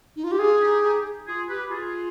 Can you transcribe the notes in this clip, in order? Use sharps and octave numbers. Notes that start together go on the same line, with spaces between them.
D#4
F4
G4
D4 F4 G#4
D#4 G4
D#4 G4
F4 G#4
G4 B4
F4 G#4